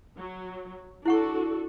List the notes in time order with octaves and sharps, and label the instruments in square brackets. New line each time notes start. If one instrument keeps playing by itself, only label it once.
[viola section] F#3
[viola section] D4 F#4 A4 [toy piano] E4 F#5 C#6